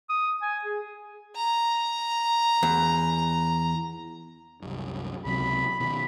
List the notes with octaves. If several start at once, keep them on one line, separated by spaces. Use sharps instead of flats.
D#6
G#5
G#4
A#5
E2
C2 F#2
C#2 C3 F#3 B5
B2 D#3 B5